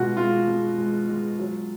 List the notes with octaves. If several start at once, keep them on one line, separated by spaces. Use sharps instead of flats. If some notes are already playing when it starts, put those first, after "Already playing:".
Already playing: B2 G#3 F4 F#4
G#3 F4
G#3
G#3
G#3
F#3